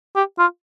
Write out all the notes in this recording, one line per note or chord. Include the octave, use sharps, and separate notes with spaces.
G4
F4